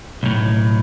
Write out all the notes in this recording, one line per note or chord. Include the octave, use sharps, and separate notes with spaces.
B1 A2